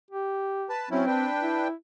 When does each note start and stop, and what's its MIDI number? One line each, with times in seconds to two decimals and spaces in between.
0.11 0.69 67
0.69 0.89 71
0.69 0.89 81
0.91 1.06 54
0.91 1.27 60
0.91 1.06 61
0.91 1.06 64
1.07 1.68 62
1.07 1.68 71
1.07 1.68 79
1.42 1.73 64